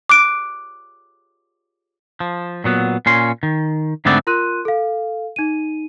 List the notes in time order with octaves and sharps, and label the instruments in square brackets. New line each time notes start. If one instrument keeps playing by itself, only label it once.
[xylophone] D6 F#6 D7
[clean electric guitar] F3
A#2 F#3 B3
A#2 C#4 C6
D#3
G#2 D3 A3 B3 C4 D5
[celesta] F4 A#4 C6 F#6 D#7
A4 F5
D#4 D#7